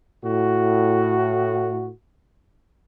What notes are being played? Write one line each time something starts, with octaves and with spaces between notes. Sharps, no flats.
A2 F#4